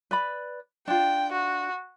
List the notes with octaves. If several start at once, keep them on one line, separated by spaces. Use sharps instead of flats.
B4 D5 B5
D4 F4 G5
F#4